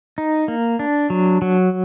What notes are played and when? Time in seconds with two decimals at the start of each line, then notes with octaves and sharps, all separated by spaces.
0.18 D#4
0.48 A#3
0.79 D4
1.10 F#3
1.42 F#3